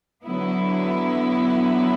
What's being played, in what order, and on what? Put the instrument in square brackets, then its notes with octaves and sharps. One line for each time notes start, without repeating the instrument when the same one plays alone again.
[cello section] D3 F#3 B3 E4